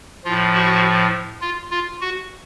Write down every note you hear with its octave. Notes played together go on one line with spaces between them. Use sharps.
A2 F3 F4
F#4
F4
F4
F#4